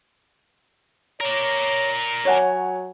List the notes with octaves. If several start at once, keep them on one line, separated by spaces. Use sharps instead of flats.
A#4 C#5 D5
F#3 C#5 F#5 G#5